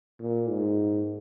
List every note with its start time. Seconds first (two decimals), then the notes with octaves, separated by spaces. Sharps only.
0.20 A#2
0.49 G#2